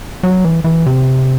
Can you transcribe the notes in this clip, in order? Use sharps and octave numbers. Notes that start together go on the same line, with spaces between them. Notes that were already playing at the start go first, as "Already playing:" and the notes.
F#3
E3
E3
C3